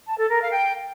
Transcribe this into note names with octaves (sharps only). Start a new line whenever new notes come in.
A5
A4
A#4
F5
G5